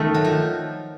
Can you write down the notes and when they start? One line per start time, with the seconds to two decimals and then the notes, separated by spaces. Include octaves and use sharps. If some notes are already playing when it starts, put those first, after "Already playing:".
Already playing: D#3 A3
0.14 F#3
0.24 F3